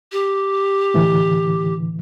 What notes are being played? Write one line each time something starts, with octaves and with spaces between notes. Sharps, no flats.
G4
A2 D3 E3